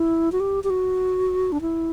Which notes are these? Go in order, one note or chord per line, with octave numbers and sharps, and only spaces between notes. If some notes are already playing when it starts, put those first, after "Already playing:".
Already playing: E4
F#4
G4
G4
F#4
D4
E4